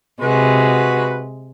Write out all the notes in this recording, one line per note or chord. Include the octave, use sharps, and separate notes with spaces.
C3 G#3 F#4 B4